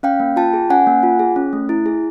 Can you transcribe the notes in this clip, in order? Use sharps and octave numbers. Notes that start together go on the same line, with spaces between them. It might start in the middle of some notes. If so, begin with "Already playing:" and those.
C#4 F5 G5
A#3
F4 G5 A5
G#4
C#4 F#5 G#5
A#3
F4
G#4
C#4
A3
E4
G#4